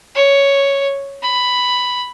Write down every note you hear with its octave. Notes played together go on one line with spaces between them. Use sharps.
C#5
B5